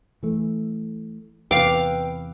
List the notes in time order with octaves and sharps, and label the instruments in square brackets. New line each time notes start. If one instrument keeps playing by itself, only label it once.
[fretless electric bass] E3 A3
[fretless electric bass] E2 C3 [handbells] B4 G5 E6 [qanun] F5 D6